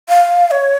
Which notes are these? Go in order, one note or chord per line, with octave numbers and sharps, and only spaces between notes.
F5
C#5